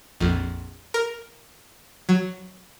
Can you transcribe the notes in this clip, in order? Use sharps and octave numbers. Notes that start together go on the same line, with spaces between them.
A#1 F2
A#4
F#3